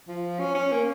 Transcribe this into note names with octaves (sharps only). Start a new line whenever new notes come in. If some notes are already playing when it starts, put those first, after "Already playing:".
F3
C#4
C#4
A#3